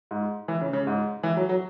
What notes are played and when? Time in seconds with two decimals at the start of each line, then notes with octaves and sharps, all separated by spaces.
0.11 G#2
0.48 E3
0.61 C#3
0.73 C#3
0.87 G#2
1.23 E3
1.37 F#3
1.49 F#3